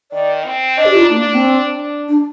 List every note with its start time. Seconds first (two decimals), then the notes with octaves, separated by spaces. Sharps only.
0.12 D#3 D5
0.45 C4
0.77 D4 D#5
0.85 G4
0.94 F4
1.02 D#4
1.10 A#3 D4
1.27 A#3
1.34 C4
1.75 D4
2.08 D4